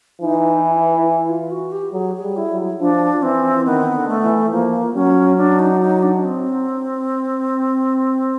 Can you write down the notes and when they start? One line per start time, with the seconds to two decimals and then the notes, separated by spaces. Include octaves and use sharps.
0.21 E3 D#4
0.64 E4
1.08 E4
1.29 F4
1.51 F#4
1.72 G4
1.93 F#3 G#4
2.15 G#4
2.23 G3
2.37 E4
2.50 F#3
2.80 F3 D4
3.22 E3 C4
3.65 D#3 B3
3.95 D3
4.08 A3
4.23 E3
4.52 F3 A#3
4.94 F#3 C#4
5.37 D4
5.59 D#4
5.81 D#4
6.02 D4
6.24 C4